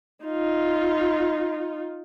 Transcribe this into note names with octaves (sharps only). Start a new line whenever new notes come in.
D#4 F4